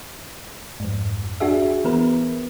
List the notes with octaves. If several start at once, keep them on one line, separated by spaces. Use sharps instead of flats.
F2 G#2
D4 F#4 G#4 E5
E3 B3 A#4 B4